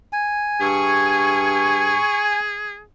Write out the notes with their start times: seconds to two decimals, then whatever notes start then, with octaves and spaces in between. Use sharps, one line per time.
0.13 G#5
0.61 G2 G#4 C#6